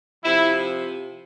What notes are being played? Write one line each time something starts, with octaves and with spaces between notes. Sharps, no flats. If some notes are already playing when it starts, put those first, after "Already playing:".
C3 F3 E4